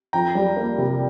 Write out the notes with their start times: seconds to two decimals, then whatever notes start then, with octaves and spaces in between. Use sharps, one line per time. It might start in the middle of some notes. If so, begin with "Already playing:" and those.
0.13 F2 G5 A#5
0.35 G3
0.56 A#3
0.78 C3